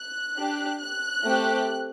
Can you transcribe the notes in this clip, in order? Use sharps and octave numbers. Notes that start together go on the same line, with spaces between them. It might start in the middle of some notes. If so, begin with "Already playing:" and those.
Already playing: F#6
D4 G4
F#6
A3 C4 G4